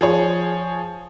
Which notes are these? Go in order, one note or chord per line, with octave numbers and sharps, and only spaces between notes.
F3 G#4 C#5